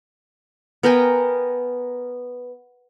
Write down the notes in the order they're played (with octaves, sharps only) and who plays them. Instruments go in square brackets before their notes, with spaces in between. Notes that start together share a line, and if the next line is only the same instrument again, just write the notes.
[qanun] B3 A#4 G5 G#5